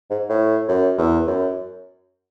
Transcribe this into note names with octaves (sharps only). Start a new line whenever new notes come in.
G#2
A2
F#2
E2
F#2